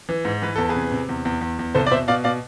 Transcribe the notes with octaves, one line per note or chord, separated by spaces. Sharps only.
E3
G#2
E3 B4
E2 A4
G#4 B4
C3
C3
E2
E2
E2
E2
C2 A4 C5
D5
B2 C5 E5
B2 D5 F5
B2 D5 F5